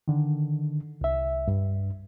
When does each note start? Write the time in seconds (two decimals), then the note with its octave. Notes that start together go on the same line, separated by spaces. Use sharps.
0.08 D3 D#3
1.01 C2 E5
1.48 G2